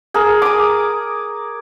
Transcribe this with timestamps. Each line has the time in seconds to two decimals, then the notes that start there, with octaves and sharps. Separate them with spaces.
0.14 G#4 A#4
0.42 D6 D#6